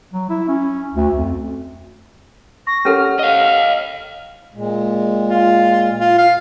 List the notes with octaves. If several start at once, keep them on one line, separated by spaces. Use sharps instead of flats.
F#3
E4
C#4
D2
F2
C#6 A#6
C#4 G4 A4 A#4 C#5 F#5 F6
D#5 F5
A#2 G#3
F4
F4
F5